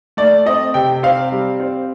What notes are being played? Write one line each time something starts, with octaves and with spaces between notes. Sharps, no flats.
A3 D5
C4 D#5
C3 G5
C4 F5
G3
C4